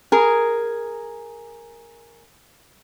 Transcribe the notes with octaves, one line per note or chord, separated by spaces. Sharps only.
G#4 A#4